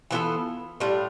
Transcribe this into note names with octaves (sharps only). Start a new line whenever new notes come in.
E3 B3 F4 A4
A2 G3 D4 F4